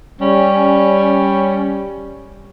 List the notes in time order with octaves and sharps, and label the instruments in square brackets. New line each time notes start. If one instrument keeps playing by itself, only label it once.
[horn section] G3 C#4